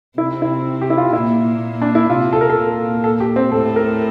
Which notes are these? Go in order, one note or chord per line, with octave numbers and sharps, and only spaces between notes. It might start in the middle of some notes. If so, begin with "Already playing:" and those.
C3 C4 E4
E4
G4
E4
F4
A#2 A#3 E4
D4
E4
C3 C4 F4
A4
A#4
A4
A#2 A#3
A4
G4
C4
A2 A3 A4
A#4